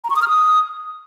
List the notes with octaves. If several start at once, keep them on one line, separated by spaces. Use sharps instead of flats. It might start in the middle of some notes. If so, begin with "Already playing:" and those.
A#5
C#6
D#6
F6
D#6